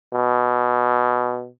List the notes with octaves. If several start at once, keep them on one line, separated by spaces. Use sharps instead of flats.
B2